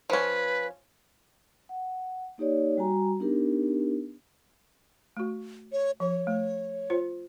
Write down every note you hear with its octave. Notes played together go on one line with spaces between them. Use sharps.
F3 C#4 B4
F#5
A#3 D#4 G4 C#5 D5
G3 F#4 G#5 A#5
B3 D4 D#4 G4 A#4
A3 F#4
C#5
F3 C#5
A3
F4 C5